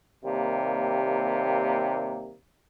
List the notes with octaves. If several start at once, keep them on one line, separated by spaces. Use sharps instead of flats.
D#2 C3 G3 A#3